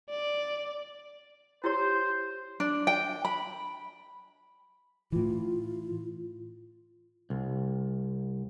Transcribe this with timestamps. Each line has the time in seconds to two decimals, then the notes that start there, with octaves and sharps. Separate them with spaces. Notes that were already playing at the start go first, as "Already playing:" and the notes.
0.10 D5
1.64 E4 G4 C5 C#5
2.60 D4
2.87 G5
3.25 B5
5.12 A2 E3 F4
7.30 C2